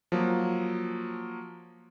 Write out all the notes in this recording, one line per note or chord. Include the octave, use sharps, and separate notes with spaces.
F3 F#3 A#3